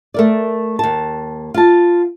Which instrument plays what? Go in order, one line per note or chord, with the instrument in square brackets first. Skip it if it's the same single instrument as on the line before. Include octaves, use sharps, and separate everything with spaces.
[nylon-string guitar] A3 A#4 D5
D#2 A5
F4 A5